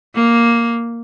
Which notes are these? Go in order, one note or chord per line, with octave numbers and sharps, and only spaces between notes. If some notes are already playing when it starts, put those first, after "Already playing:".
A#3